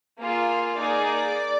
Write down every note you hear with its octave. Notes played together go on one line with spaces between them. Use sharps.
A#3 F4 G#4
A#3 D#4 G#4 D5